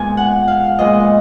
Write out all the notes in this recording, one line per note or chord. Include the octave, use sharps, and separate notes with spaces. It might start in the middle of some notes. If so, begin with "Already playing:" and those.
Already playing: A#2 G#3 B3 G#5
F#5
F5
A#2 G#3 B3 D#5